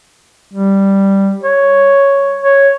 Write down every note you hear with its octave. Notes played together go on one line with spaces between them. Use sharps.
G3
C#5
C#5